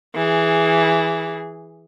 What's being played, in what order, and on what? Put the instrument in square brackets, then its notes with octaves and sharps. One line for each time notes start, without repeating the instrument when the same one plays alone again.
[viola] E3 G#4